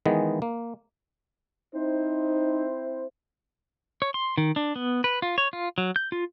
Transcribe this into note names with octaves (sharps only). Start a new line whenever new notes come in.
D#3 E3 G#3 B3
A#3
C4 D#4 E4 C5
C#5
C6
D#3
D4
B3
B4
F4
C#5
F4
F#3
G6
F4